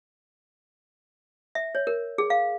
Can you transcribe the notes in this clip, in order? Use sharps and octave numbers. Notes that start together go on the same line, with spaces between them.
E5
C#5
A#4
G#4
F5